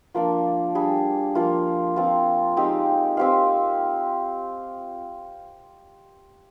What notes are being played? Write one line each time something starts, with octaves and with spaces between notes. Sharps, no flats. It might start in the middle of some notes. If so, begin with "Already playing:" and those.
F3 A#3 D4
G3 D4 G#4
F3 A#3 F4
F3 C4 F4
G#3 C4 D#4 G4
C4 G4 C5 F5